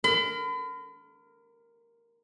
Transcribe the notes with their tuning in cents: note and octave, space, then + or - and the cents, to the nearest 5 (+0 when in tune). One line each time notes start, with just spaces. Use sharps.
A#4 +0 B5 +40